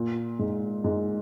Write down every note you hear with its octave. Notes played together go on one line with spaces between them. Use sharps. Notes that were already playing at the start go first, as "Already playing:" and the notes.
Already playing: A#2
G#2
G#2